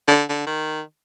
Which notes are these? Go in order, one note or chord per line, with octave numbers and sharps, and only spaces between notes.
D3
D3
D#3